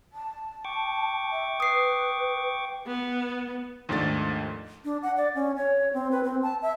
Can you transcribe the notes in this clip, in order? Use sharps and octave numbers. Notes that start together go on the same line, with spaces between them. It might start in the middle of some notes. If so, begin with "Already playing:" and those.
A5
G5 C#6 D6
E5
B4 D#6 C7
B3
D#2 G#2 F3 A3 D4 A6
D4
F#5
D5
C#4
C#5
C4
B4
C4
A5
E5